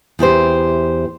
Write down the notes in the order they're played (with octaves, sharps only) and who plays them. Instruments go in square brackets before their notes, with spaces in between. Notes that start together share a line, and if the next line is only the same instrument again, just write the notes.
[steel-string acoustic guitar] E2 E4 G4 C5